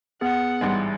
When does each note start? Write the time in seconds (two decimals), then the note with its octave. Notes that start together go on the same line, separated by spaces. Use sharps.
0.21 B3 G#4 F#5
0.61 A1 G#2 E3 G3 G#3 D#4